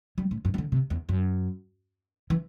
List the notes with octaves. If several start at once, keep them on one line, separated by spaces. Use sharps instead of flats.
G3
A2
G2
E3
D3
C3
E2
F#2
E3